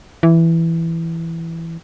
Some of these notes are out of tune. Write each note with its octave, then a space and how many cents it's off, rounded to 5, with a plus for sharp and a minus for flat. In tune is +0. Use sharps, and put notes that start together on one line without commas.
E3 +5